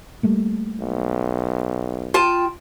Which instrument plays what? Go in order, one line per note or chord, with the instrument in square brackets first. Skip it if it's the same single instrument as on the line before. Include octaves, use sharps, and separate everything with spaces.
[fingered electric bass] G3 A3 A#3
[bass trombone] B1
[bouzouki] F4 G5 A5